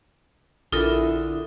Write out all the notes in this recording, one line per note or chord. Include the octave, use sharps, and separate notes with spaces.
A#1 D3 E4 F4 A4 A#4 D#6